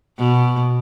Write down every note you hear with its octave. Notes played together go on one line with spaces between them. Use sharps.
B2